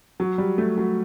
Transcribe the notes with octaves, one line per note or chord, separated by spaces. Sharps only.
F#3
G3
A3
F#3